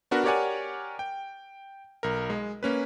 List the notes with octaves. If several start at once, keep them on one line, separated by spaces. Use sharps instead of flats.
B3 D4 F#4 A#4 B4
G4 A#4 C#5 D5 F#5 G#5
G5
B1 A#4
G#3
A#3 C#4 B4